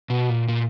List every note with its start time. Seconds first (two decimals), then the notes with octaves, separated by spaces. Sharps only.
0.10 B2
0.30 A#2
0.48 A#2